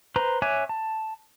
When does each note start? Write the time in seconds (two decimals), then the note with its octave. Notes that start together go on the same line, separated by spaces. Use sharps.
0.16 B4 C5 A#5
0.42 C#5 E5 G#5 D6 F#6
0.69 A5